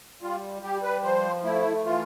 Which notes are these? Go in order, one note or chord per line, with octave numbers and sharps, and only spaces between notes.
G3 F4
G3 G4
B4
F3 C5
A3 E4
E3 F4